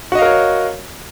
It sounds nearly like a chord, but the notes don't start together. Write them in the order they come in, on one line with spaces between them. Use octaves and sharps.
F#4 D#5 F5 A#4 C#5